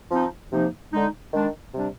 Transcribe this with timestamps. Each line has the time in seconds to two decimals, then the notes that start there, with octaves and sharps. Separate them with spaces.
0.11 F3 C4 D#4
0.52 C3 F3 A#3 D#4
0.92 D3 G#3 D#4
1.33 D#3 G#3 D4
1.74 C3 G3 D4